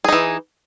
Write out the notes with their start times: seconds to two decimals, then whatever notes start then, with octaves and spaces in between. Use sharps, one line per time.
0.04 G#4
0.08 D#4
0.12 E3